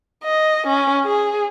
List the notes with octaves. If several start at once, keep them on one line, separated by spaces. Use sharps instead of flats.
D#5
C#4
G#4